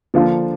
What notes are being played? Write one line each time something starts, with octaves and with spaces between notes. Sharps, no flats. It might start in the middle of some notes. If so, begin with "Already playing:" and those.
D3 F3 A#3 D4 F4